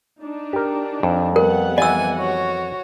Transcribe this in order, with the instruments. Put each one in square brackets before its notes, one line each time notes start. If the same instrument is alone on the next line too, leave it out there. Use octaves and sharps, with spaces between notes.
[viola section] D4 D#4
[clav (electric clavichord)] G4 A#4
F2
[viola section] G3 B3 F#5 [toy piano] A#4
[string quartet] E3 G#5 [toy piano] D#5 E6
[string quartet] F#4 C#5